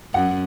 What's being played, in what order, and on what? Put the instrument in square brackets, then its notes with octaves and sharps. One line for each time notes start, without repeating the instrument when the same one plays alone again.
[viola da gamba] F#2 [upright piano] F#5